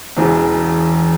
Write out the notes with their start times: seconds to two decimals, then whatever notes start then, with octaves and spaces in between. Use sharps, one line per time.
0.17 E1 E2 C#3 E3